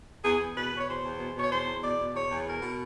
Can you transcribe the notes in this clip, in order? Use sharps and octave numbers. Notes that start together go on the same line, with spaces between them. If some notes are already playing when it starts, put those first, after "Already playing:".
E2 G#4
E2
B2 B4
B2
C#5
E2 C5
E2
B2
B2 C#5
E2 C5
E2
B2 D5
B2
E2 C#5
E2
B2 A#4
B2